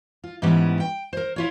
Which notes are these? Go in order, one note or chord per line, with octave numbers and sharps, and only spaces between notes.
F4
G#2 E3 G3 B3 C#4 E4
G5
A#4 C5
E4 F4 C#5